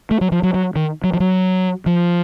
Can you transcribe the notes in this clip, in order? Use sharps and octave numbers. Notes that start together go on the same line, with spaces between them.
A3
F#3
F3
F#3
F#3
D#3
F#3
F3
F#3
F3